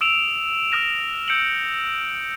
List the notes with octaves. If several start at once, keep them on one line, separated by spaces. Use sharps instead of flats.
D#6 E6 D7 E7 F7
D#6 F6 A#6 E7
E6 G6 C#7 D7 E7 F#7